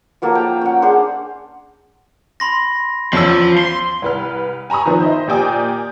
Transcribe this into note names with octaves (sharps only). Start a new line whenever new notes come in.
F3 F#3 A#3 A4
F5 G5 A#5
C#4 F#5
D4 G#4 C5 F#5
B5 C6 A#6
E2 F3 C#4 E6 B6
C6
C2 B4 F6
G#5 A#5 B5 C#6 D#6
D#3 F3 B3
C5 D#5 E5
A#2 G4 D5 G5 G#5 D#6